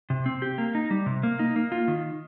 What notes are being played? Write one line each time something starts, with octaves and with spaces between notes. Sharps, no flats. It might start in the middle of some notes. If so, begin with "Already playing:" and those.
C3
C4
G4
A#3
D#4
G3
C3
A#3
D#4
A#3
F4
D#3